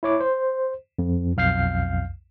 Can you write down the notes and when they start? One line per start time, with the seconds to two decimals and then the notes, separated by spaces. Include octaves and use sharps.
0.03 E4 C#5 D6
0.20 C5
0.99 F2
1.37 B1 F2 F5 F6 G6 C7